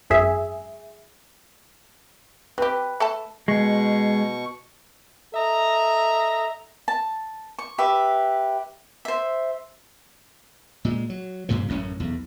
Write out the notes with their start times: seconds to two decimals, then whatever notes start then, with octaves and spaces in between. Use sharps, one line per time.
0.10 G#1 F#2 G#4 E5
2.58 C4 G4 B4
3.00 A3 A4 A5
3.48 B2 G#3 C#6
5.34 A4 D#5 E5 A#5
6.88 A5
7.59 C#6
7.78 G4 B4 E5
9.05 C5 E5
10.85 A#2 G#3
11.10 F#3
11.49 G2 A#2 C#3 F3
11.69 A1 F#2 C#4
12.00 B1 E2